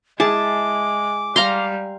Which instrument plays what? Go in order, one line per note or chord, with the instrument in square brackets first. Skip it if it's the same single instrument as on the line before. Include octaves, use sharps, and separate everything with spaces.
[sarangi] G#3 [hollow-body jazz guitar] E4 G#4 [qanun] A5 [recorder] D6
[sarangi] G3 [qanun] F5 A#5 C6